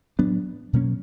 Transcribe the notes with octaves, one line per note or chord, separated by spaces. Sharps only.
A2 F#3 B3 D4
B2 F#3 A#3 C#4